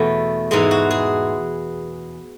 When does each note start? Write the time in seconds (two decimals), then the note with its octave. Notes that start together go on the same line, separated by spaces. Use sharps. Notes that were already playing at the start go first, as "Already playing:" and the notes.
Already playing: E2 B2 A3
0.51 G#2 E3 G#3 G#4
0.71 F#4
0.91 G#4